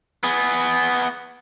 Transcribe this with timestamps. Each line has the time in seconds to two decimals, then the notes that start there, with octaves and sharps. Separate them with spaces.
0.24 B3 G#4